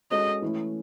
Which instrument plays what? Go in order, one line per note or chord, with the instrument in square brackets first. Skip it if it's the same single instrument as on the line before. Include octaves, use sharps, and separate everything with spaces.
[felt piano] G#3 C#4 F#4 A4 [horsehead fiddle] D#5
[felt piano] E3 A3 C#4 E4